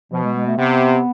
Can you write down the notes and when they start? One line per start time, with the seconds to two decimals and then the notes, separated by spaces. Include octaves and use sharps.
0.11 B2 F3
0.24 G#3
0.35 G#3
0.47 A3
0.58 C3 B3